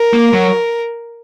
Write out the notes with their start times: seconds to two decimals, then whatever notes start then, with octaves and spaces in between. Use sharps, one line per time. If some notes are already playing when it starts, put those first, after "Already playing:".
Already playing: A#4
0.13 A#3
0.33 F#3